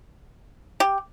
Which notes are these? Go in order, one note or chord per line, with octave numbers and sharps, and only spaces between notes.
G4